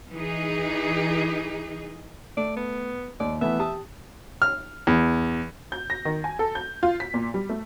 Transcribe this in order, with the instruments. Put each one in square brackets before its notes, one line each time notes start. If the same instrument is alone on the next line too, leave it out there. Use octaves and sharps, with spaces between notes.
[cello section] E3 D#4 G#4
[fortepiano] A3 [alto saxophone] D5
[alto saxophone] B3
[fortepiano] D#2 [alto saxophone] D5
[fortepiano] E3 A3 B3 [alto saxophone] E5
[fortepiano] G4 A5 D#6
F6
E2
[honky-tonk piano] G6
A#6
D#3
G#5
A4
G6
F4
B6
A#2
G3
A3